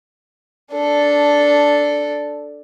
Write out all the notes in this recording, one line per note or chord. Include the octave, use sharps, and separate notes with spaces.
D4 A4